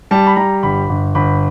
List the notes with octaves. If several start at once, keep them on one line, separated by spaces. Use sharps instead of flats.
G3 A5
B5
G3 A#5
G1 B5
G1
G1 B5